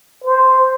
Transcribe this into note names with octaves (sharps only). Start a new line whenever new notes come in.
C5